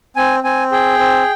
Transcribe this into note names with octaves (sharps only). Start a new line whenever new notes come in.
C4 G#5
C4 G#5
G#4 G5
C4